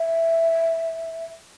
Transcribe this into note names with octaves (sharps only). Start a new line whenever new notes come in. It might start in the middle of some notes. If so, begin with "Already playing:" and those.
Already playing: E5